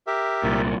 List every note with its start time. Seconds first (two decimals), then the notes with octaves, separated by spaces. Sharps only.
0.07 G4 A#4 E5
0.43 C2 A#2